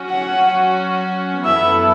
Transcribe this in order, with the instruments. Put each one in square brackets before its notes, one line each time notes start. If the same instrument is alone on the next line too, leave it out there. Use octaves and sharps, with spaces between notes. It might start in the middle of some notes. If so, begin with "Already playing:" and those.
Already playing: [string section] F#3 C#4 F#4
[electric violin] F#5
[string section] F#2 E3 B3 E4 A4 [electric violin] E5